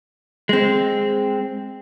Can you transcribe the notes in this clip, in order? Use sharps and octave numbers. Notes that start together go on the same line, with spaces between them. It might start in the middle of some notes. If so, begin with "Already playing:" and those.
G#3 C4